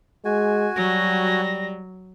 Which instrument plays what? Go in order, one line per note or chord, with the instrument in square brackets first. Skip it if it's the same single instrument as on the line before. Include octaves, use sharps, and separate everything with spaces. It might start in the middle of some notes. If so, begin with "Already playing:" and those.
[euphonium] G#3 [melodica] F#4 G#5
[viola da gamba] F#3 [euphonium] G3 [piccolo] A#6